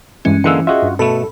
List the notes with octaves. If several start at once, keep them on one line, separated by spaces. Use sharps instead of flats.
G2 E3 G#3 C#4
D3 E3 G#3 A#3 E6 F#6 C#7
F4 F#4 G#4 D#5 E5
G2
B2 A3 A4 B5